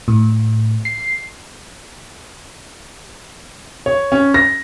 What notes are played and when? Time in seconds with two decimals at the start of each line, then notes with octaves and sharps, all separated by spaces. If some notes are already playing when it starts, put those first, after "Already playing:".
0.08 A2
0.85 C7
3.86 C#5
4.12 C#4
4.34 A#6